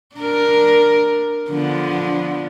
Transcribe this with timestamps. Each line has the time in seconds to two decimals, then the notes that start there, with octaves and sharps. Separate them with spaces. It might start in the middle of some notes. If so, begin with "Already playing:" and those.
0.17 D4 A#4
1.50 D3 F3 B3